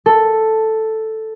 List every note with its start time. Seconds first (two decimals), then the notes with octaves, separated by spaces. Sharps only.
0.06 A4